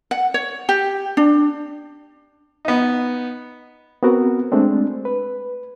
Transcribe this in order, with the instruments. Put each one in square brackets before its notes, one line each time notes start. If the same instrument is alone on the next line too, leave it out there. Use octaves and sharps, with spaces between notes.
[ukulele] F#5
C#5
G4
D4
[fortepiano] B3 D#4
[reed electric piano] B3 C4 F#4 A#4
G#3 A3 C4 D4
B4